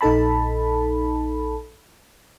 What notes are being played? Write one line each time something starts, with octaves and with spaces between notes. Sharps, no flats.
A#1 D#4 A4 A5 B5